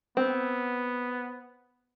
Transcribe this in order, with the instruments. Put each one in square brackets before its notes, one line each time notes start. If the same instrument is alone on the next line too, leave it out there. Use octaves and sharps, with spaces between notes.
[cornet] B3 [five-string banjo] C4